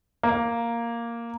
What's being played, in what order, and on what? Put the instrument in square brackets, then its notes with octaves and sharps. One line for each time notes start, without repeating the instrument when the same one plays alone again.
[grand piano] A#3